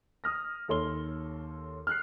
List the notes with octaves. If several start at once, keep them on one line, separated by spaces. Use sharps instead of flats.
D#6 F6 A#6
D#2 A4 C#5 C6 G7
F6 F#6 C7